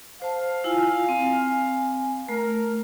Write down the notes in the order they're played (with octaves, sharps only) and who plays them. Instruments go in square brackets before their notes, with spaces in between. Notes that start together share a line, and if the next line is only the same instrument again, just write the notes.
[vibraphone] C5 A5 [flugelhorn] F5
[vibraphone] E4 F4 G#5
C4 G#5
[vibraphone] A3 [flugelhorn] A#4